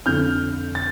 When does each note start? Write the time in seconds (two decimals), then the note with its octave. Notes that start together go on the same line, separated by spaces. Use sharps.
0.06 F2 D3 F3 F6 G6
0.75 A6